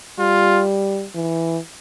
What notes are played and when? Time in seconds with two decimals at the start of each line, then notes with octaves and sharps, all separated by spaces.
0.19 G3 F4
1.15 E3